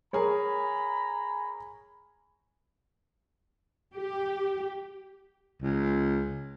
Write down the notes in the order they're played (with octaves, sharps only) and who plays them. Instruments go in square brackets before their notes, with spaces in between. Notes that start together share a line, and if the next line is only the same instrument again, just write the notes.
[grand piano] G#4 A#4 C#5 [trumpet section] G#5 A#5 B5
[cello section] G4
[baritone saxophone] C#2